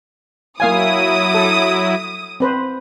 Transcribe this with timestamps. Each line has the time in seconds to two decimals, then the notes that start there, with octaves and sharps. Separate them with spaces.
0.60 F#3 A#3 E4 F5 G#5 D#6
1.34 A4
2.40 C4 B4 C5